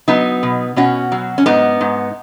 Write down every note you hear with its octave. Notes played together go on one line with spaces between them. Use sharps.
F#3 B3 D#4
B2
B2 C#4 F#4
F#3
C#4
G#2 B3 D#4
G#2